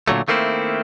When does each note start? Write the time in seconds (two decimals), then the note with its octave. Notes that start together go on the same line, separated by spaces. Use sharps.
0.07 A#2 D3 F#3 A3
0.28 D#3 A3 A#3 C4 E4